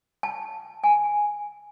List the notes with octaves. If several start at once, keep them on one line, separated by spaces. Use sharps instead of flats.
A5
G#5